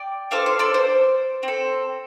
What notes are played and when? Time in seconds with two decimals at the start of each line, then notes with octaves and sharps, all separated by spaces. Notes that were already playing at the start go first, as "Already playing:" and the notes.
Already playing: D5 G5
0.31 D4 F4 A4 C5 F5
0.46 C5
0.59 A4 D5
0.74 C5
1.43 C4
1.48 A4